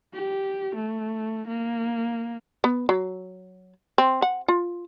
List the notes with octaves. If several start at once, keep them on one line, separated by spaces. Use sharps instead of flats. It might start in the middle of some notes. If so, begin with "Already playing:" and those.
G4
A3
A#3
B3
F#3
C4
F#5
F4